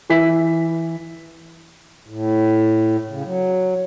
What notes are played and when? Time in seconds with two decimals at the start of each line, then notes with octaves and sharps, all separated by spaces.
0.10 E3 B4 E5 B6
2.08 A2
3.10 C#3
3.24 F#3